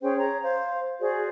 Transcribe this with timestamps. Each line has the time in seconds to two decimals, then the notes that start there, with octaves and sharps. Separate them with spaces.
0.02 C#4 G#4 C5 G5
0.17 C#5 A#5
0.43 C5 F5
1.00 F#4 G#4 C5 D5